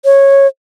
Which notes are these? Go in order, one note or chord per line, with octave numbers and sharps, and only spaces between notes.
C#5